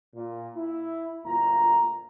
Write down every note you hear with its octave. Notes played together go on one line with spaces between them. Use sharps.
A#2
E4
G1 D2 A#2 F4 A#5